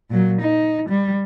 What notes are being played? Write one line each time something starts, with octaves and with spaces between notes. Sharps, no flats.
A#2 F#3
D#4
G3